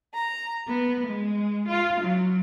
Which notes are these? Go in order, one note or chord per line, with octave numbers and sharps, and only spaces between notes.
A#5
B3
G#3
F4
F#3